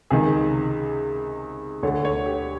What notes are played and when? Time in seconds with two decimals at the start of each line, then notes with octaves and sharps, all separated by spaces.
0.10 C#2 C3 D#3 G#4
1.83 D2 D3 C#5
2.05 C#5
2.26 G4